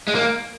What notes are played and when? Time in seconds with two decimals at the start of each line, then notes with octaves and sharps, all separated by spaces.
0.08 G#3
0.15 A#3